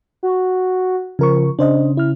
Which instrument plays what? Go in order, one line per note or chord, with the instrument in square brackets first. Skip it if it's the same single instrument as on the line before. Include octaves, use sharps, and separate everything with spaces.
[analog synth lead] F#4
[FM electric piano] C#3 A#4 C#6 [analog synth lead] F3
[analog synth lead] C#3 [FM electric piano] D4 C5 D#5
[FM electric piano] E4 F6